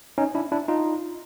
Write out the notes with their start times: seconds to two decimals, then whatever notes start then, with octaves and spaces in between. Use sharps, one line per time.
0.18 C#4 D#4
0.35 D4 E4
0.52 D4 E4
0.68 D#4 F4